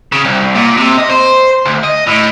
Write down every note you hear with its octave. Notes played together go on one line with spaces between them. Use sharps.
C#3
C2
A#2
C3
D#5
C5
D2
D#5
A2